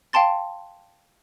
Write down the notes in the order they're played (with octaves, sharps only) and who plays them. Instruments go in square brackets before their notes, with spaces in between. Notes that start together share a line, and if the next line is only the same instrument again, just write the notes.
[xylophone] F5 G5 A5 C6 A6